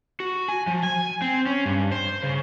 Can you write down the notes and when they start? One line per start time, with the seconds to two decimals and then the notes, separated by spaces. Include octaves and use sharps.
0.20 F#4
0.48 G#5
0.67 F3
0.83 G#5
1.22 C4
1.46 C#4
1.66 G2
1.91 C5
2.23 C#3